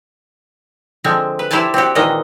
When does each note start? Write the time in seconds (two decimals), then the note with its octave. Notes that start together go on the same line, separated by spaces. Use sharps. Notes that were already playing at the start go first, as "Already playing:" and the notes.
1.04 D3 F3 G#3 C4
1.39 B4
1.51 E4 G4 C5 D5 G#5 A5
1.74 C4 D4 F#4 G4
1.95 A#2 D#3 E3 G#3 A#3 D#5